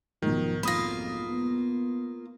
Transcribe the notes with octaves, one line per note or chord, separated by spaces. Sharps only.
B1 G#2 D#3 F3
F2 A#3 F4 B5 D#6 A#6
B3